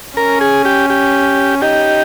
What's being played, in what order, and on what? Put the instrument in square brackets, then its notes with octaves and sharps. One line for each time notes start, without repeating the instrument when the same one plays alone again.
[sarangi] C#4 [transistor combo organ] A#4
[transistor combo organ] G#4
G4
G4
[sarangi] D#4 [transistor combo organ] G4